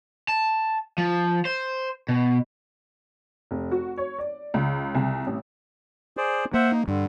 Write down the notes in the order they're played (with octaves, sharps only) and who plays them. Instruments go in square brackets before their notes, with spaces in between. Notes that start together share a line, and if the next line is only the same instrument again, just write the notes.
[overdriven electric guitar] A5
F3
C5
B2
[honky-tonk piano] F1
F#4
C#5
D5
C#2
C2
A1
[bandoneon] G#4 C5 D5
[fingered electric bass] A#3 [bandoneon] C5 E5 F#5
[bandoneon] D#4
[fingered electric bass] G2 [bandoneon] D3